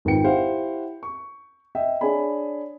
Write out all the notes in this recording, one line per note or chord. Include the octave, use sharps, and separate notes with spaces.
G#1 D#3 F4 B4 G5 C#7
E4 G4 B4 C5 F5 F#5
C#6
D#5 E5 G5
D4 G#4 C#5 D5 G#5 B5